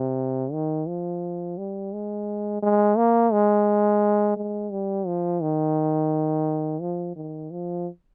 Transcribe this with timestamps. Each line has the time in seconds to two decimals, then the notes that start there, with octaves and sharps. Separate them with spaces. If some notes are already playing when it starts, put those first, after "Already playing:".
Already playing: C3
0.52 D#3
0.88 F3
1.58 G3
1.93 G#3
2.62 G#3
2.98 A#3
3.32 G#3
4.37 G#3
4.71 G3
5.06 F3
5.42 D#3
6.81 F3
7.16 D#3
7.51 F3